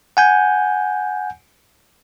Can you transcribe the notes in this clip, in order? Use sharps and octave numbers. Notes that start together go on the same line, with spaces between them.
F#5 G#5 G6